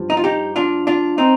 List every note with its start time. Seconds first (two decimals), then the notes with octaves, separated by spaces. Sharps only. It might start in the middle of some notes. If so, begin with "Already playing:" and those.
Already playing: G2 F3
0.10 D#4
0.17 F4
0.24 D#4 G4
0.56 D4 F4
0.87 D4 F4
1.18 C4 D#4